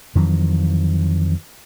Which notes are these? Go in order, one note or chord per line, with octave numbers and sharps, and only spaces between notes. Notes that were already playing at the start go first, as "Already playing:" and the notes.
F2 D#3 E3 F#3